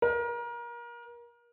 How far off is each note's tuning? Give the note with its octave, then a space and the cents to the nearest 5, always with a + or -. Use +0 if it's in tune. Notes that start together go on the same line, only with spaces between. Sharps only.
A#4 +30